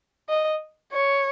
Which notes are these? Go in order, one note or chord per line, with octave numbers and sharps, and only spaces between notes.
D#5
C#5